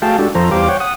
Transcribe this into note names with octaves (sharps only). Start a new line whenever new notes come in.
A3 F#4 G#4 F5 G5 A5
G#3 D4 F#4 G4 A4
F2 F3 A4 C5 A#5
E2 G3 G4 C5 F5 D6
C#5 F#5 G5
F#5 D#6